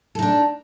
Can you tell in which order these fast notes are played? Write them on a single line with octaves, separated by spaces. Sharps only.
A4 D#4 D4